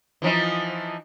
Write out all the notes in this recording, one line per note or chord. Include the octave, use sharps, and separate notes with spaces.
E3 F3 D#4